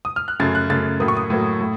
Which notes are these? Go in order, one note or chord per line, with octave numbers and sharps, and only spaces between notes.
D#6
F6
F#6
F#2 C#3 A3 A6
F#6
F#2 C#3 A3 A6
A2 F#3 A#3 D#6
C#6
D#6
A2 F#3 A#3
A2